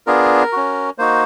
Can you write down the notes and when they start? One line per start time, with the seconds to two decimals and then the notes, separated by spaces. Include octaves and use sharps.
0.07 B3 D4 F4 G#4 A#4
0.52 C#4 F#4
0.98 A#3 D#4 F#4 C5